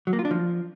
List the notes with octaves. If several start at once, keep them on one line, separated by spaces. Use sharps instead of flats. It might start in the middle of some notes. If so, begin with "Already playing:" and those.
F#3
A#3
F4
D4
F3